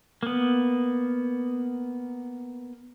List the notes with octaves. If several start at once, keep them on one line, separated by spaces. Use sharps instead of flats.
A#3 B3